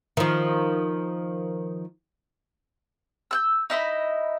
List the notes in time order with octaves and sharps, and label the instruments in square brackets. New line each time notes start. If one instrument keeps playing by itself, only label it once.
[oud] D#3 F3
[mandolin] E6 F#6 G6
D#4 E4 D#5 B5